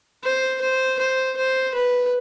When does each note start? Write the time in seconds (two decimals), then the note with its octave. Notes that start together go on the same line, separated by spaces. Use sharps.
0.24 C5
0.61 C5
0.99 C5
1.37 C5
1.75 B4